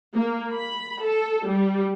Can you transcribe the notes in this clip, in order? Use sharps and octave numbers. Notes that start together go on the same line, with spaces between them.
A#3
B5
A4
G3